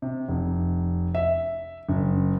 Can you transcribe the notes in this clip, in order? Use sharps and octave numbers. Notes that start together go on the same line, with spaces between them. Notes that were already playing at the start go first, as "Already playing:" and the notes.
C3
F1
E5
F#1